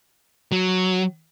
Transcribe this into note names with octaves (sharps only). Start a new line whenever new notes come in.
F#3